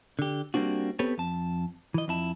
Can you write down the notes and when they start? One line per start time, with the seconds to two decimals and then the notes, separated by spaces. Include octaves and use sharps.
0.19 D3 G4
0.54 G3 A#3 C4 D4 F#4
0.99 B3 C4 G4 A4 B4 C#5
1.18 F2 A5
1.94 E3 D#5
2.08 F2 E4 A5